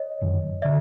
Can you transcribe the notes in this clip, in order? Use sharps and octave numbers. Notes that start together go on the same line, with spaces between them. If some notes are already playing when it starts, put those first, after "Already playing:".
Already playing: C#5 D#5
F#1 F#2 D#3
D3 D5 E5